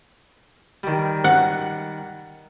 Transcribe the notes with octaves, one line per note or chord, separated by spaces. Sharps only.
D#3 G3
F#5